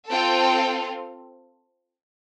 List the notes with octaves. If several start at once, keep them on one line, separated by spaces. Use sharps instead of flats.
C4 F4 A4 G5